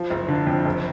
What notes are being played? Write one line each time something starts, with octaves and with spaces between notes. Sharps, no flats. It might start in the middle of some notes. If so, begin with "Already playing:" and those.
Already playing: F3
F#1
D3
F2
F#1